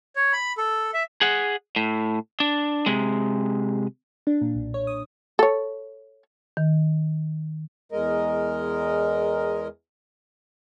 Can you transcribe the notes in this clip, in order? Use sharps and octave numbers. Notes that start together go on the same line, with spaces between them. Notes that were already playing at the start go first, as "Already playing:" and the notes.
C#5
B5
A4
E5
G#4 F#5
A2
D4
C3 G#3
D4
A#2
B1
C#5
D#6
A4 C#5
D#3
E2 G#3 A#4 D#5